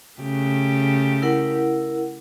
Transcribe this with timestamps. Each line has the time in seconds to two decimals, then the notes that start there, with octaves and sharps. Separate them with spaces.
0.21 C#3 A3 G4
1.22 E4 A#4 F#5